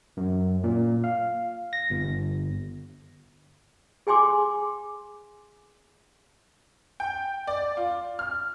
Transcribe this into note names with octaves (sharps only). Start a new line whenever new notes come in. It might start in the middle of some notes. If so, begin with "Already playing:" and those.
F#2
A#2
F5
A#6
G1
G#4 G5 G#5 C6 D6
G5
D5
F4
F6